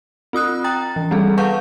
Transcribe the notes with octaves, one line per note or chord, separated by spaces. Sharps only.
C4 F4 D#6 F#6
G5 A#5 A6
E3
G3 B3 C4 G#4 A4
B4 F5 F#5 A5 C#6 G6